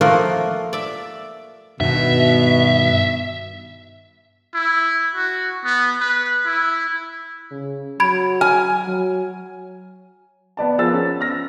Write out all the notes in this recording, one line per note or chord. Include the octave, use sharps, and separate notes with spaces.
F3 A3 A#3 F4 F#4 A#4
D5 E5
G2 B2 D#3 F#4 E5
E4
F#4
B3
B4
E4
C#3
F#3 B5 G#6 D7
G#5 F6
F#3
B3 D5 A5
F3 B3 G#4 A#4 E6 A6
C#4
F6 A#6